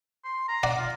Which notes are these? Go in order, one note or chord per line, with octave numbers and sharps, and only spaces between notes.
C6
A#5
D5 F#5
F4